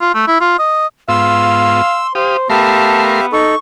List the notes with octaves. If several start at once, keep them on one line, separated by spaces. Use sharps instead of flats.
F4
A3
E4
F4
D#5
G#2 B3 F4 F5 C6 E6
G4 C5 F5 D#6
A3 B3 G4 A#4 E5 F5 A5 C6
D#4 A4 C#6